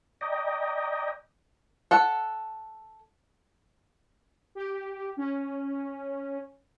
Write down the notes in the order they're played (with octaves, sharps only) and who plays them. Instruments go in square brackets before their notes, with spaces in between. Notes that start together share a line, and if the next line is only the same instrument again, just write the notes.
[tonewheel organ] D5 D#5 G5 A#5
[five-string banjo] A4 F#5
[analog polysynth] G4
C#4